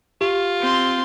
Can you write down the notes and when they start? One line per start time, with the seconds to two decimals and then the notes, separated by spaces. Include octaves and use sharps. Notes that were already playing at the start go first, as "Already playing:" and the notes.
0.21 F4 G4
0.61 C4 C6